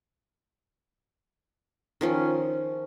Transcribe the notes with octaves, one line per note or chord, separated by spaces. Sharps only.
D#3 F3 C#4